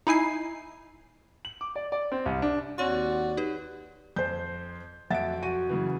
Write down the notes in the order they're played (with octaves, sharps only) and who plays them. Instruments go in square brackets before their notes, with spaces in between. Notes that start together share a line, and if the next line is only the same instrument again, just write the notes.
[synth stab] D#4 E4 G#5 C7
[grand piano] F#7
D6
D5
D5
C4
C2
D4
[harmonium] D#2 D5 [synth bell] C4 C#5 C6 [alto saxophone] F#4
[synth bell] D#4 G4 B4
[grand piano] F2 [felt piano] C5 G6
[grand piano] F2 F#3 D7 [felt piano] E5 F#5 A6
[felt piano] F#4 D#7
[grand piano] F#2 C#3 E3